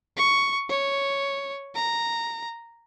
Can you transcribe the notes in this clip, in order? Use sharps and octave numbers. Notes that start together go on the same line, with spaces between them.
C#6
C#5
A#5